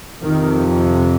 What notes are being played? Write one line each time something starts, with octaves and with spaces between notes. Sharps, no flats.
F2 C3 D#3